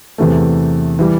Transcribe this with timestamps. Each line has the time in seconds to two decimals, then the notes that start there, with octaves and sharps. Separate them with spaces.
0.18 E2 C3 E3 A3
0.99 E3 G3